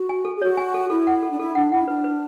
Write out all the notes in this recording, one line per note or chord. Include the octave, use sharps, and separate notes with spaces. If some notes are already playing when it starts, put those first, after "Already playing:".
Already playing: F#4
G#5
A4
G#4
F#4 C#5
G#5
A4
E4 A4
F#5
A4
D4
E4 A4
D4 F#5
E4 F#5
D4 B4
B4